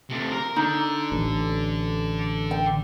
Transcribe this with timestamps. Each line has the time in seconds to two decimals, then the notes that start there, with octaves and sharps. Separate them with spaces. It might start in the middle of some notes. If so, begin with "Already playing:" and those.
0.10 C3 A3
0.32 A#4
0.56 D3 D#4
1.12 A1
2.51 G5